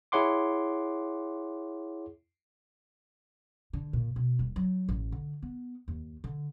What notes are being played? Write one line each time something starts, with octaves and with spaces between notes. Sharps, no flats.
E4 G#4 C#5 F#5 C6 D6
D3
A#2
B2
D#1
F#3
A1
D3
B3
D#2
D3